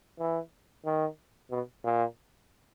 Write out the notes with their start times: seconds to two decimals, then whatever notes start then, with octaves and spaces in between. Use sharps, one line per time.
0.19 E3
0.85 D#3
1.51 B2
1.84 A#2